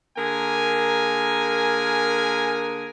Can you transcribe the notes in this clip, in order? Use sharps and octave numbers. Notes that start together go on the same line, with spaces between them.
D3 A#3 G#4 A#4 G#5